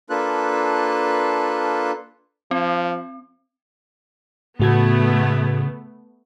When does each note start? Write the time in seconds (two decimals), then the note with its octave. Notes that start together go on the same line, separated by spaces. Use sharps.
0.10 A#3 D4 F4 A4 B4 F#6
2.51 F3 C4
4.60 A2 C#3 A3 B3 F#4 G#6